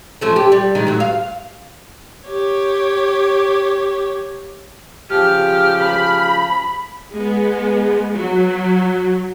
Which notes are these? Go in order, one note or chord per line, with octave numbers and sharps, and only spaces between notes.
F3 A3 C#4
G4
G3
D#3 G#3 D#4
A2 F#3
F5
G4 C#5
C#3 F3 G4 F6
B5
G#3 B3
F#3